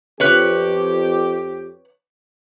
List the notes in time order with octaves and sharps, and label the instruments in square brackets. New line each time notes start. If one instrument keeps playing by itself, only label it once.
[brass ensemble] F2 G4 [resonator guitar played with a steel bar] B4 C#5